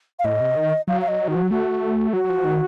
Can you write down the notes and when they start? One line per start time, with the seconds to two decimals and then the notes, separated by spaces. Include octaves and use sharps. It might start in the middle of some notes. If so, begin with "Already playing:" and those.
0.19 F5
0.24 A2 D#5
0.40 C3
0.56 D#3
0.88 F#3 F5
1.01 F5
1.08 D#5
1.28 D#3 F#4
1.35 F3
1.43 F#3
1.51 A3 F#4
2.13 F#3 F#4
2.24 F#3
2.29 F3
2.44 D#3